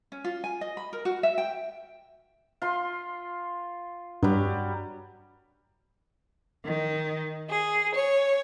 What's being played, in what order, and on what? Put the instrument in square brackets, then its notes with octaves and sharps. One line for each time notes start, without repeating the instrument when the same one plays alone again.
[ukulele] C#4
F4
G#5
D#5
B5
A#4
F#4
E5
G5
[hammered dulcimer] F4 C6
[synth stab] G2 [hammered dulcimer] F#3 G3
[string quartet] D#3
G#4
C#5